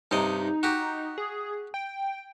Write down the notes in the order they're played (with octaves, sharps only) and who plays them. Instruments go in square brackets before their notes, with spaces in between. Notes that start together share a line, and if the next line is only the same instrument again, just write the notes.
[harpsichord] G2 C3 D#5 [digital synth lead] D#4
[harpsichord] F#4 G4
[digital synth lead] G#4
G5